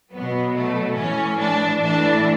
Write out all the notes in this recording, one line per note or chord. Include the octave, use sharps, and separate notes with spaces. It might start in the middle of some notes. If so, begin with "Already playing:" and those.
B2 F#3 B3
A3
A2 E3 C#4
D4
A2 E3 D4